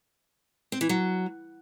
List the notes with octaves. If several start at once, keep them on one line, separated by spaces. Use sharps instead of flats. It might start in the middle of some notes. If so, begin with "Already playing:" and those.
C4
E3
F#3